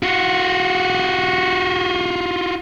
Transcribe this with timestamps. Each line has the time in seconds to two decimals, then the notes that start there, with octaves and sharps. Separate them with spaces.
0.03 F4 F#4